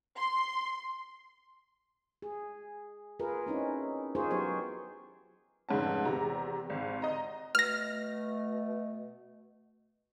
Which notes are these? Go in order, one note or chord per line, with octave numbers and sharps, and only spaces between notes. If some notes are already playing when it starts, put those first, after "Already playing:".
C6
G#4
F4 G#4 A#4 B4
C4 C#4 D#4 E4
D#4 F4 G#4 A#4 C5 C#5
F#3 B3 G4 C5 C#5
F1 G#2 C#4 A5
E2 C3 A#5
G#1
D#5 A#5
B2 A3 F6 A#6